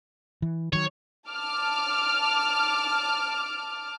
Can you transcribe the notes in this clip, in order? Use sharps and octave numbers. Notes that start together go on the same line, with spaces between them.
E3
D#3 F#3 C#5
A5 D6 F6